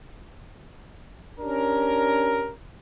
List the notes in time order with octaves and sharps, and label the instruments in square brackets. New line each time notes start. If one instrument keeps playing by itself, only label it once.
[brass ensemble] C#4 D4 G4 A#4